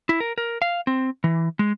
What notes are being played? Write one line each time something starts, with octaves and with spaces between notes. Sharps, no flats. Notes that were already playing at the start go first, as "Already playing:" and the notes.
E4
A#4
A#4
F5
C4
E3
G#3